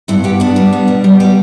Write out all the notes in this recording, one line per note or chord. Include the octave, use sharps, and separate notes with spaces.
G2 E4
B3 G4
B3 D4
G3
B3
B2
G3
G3